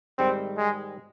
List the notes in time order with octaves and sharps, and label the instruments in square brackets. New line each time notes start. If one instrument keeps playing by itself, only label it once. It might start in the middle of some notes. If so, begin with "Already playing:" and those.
[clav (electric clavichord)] G#2 D#3 G3 [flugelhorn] C4
[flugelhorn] G#3